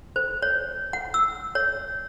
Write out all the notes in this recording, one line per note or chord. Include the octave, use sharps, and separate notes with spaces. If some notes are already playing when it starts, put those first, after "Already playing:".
C5
C#5
F#5
E6
C#5